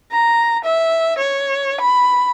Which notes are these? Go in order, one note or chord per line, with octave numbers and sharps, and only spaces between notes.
A#5
E5
C#5
B5